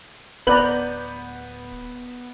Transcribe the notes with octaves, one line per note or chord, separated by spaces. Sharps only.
D1 B3 B4 D5 A#5 G6 F#7